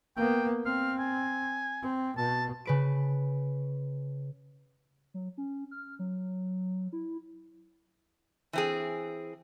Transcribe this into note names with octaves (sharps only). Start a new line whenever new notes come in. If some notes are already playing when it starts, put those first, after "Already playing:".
A#3 B3 G5
C4 F5
G#5
C4
B2 A5
C#3 B4 D7
F#3
C#4
F6
F#3
E4
E3 C4 G#4